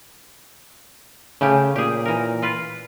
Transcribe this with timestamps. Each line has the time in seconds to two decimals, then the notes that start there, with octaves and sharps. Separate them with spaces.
1.41 C#3 A3 C#4 G4
1.76 A#2 G4 G#4
2.05 E3 A#4
2.42 F4 B4